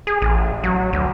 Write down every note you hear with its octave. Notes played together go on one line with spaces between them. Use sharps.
G#4
A1
F#3
D2